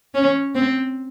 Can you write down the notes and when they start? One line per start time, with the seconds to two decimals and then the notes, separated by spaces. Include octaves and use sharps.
0.14 C#4
0.55 C4